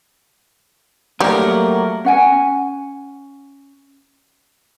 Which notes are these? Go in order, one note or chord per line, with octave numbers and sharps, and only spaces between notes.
F#3 G3 A3 A#3 A#4
C#4 F#5 G#5